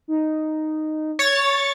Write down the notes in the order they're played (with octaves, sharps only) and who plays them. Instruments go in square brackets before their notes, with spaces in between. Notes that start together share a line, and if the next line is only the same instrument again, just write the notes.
[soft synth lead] D#4
[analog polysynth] C#5 A6